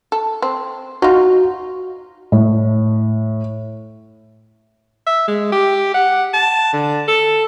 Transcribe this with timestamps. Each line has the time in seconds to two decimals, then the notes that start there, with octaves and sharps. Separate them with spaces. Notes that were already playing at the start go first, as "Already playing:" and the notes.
0.12 A4
0.42 C4
1.02 D#4 F4 F#4
2.32 A2
5.07 E5
5.28 G#3
5.52 G4
5.94 F#5
6.33 A5
6.73 D3
7.08 A4